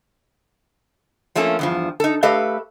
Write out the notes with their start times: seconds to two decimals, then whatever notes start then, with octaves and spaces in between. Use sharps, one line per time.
1.35 F3 A3 A#3 C#4 A4
1.59 E2 G2 F3
2.00 D#4 A4
2.23 A3 G4 A4 B4 D#5 F5